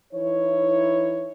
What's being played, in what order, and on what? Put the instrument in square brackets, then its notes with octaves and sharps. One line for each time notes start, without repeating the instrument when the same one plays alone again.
[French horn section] E3 D#4 E4 C#5